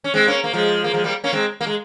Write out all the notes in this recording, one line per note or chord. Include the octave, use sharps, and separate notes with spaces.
C#4
G#3 C4
A#3 C#4
A#3
F3 G#3
A#3
F3 G#3
G3 A#3
A#3 C#4
G#3 C4
A#3
G#3